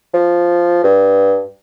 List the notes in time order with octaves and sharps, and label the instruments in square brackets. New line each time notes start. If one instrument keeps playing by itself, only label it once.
[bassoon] F3
G2